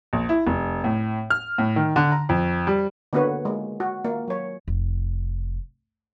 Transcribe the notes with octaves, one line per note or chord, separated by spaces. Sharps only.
A#1
E4
F1
A2
F6
A2
D#3
D3
A#5
F2
G3
D3 A#3 B3 F#4 B4 C#5
G#3 A#3
F#4
A#3
F#3 C#5
F1